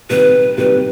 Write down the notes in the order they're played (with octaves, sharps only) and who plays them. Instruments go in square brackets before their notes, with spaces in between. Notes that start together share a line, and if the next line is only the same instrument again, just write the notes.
[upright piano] C3 D#3 G3 [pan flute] B4
[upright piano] C3 D#3 G3 [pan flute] B4